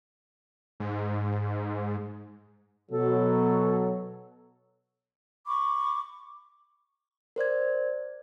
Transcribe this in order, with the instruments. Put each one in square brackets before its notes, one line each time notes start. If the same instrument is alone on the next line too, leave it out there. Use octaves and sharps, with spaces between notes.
[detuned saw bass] G#2
[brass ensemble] B2 F#3 [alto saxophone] A4
[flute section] B5 C#6 D6
[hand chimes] A#4 C5 D5 G#6